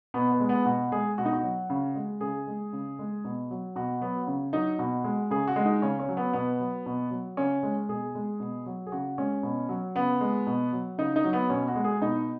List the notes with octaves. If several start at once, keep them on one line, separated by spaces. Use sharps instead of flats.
B2 B3
B3
G#3
B3
B2 F#4
G#3 G#4
B2 F#4
D#4
F#4
F#3
C#3
G#3
C#3 G#4
G#3
C#3
G#3
B2
F#3
B2 F#4
F#3 B3
C#3
F#3 D#4
B2 F#4
G#3
C#3 G#4
F#4
G#3
D#4
C#3 C#4
C#4
F#3
B3
B2 B3
F#3
B2
F#3
C#3 C#4
G#3
B2 G#4
G#3
B2
F#3
G#4
C#3 F#4
G#3 C#4
B2
F#3
C#3 B3
G#3
B2
F#3
C#3 D#4
D#4
F#3
B3
B2 C#4
F#4
G#3
G#4
B2 D#4